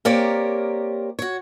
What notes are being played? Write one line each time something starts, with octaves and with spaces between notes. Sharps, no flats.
A#3 C4 G4 A#4 C#5 D5
F#4 C#5